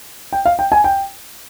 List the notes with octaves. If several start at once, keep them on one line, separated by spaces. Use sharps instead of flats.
G5
F5
G5
G#5
G5